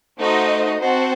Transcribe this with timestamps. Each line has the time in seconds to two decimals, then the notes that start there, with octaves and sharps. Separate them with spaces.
0.20 A3 D#4 F#4 C5 D#5
0.81 C4 F#4 C5 F#5 A5